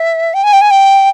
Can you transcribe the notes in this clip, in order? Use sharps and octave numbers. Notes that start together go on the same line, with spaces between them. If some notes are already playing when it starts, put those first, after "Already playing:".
Already playing: E5
G5
G#5
G5
G#5
G5